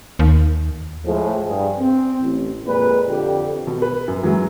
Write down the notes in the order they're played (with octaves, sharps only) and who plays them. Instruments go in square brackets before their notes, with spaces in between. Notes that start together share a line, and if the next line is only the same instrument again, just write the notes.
[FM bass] D#2
[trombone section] A2 F3 G#3 A3
G2 G#4
C4
A1
F2 A#2 G#3 B4
F2 D3 G4
[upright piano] B2
B4
F#2
F#2 E3 F#3 G#3